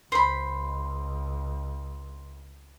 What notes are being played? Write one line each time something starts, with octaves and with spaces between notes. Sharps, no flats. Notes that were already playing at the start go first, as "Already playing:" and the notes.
C#2 C5 B5 C6